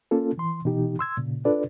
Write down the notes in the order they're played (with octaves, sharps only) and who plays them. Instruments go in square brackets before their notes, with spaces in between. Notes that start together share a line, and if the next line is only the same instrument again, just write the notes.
[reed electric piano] A#3 C#4 F4 A4
E3 C6
B2 E3 D#4 G4
C6 E6 G#6
A#2 C#3
D4 F4 A4 B4 D5